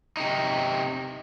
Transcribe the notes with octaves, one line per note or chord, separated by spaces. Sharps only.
C3 D#4